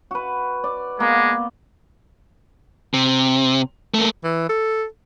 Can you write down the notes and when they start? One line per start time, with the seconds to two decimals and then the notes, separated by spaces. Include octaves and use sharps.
0.11 F#4 B4
0.64 D5
1.00 G#3 A#3 B3
2.94 C3
3.94 A3 A#3
4.24 E3
4.49 A4